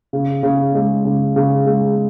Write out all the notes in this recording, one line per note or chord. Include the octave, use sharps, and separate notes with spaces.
C#3
C#3
G#3
C#3
C#3
G#3